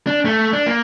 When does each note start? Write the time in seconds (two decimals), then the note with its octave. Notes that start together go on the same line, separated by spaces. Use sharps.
0.07 D4
0.25 A3
0.53 D4
0.66 A#3